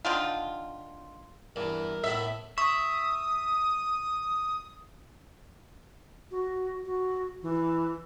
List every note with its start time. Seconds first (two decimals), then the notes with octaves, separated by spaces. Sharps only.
0.05 D3 D#3 F4
1.56 E2 G2 E3 A#4
2.04 A2 B3 E5
2.58 E5 C#6 D#6
6.31 F#4
6.86 F#4
7.43 E3